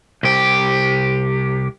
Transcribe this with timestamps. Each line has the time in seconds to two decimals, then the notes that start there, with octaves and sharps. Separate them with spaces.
0.23 C2 G4